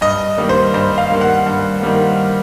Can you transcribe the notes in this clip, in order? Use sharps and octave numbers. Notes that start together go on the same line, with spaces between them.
G2 D#5
D#3 G3 A#3
C5
G2 C5
F5
D#3 G3 A#3
F#5
G2
D#3 G3 A#3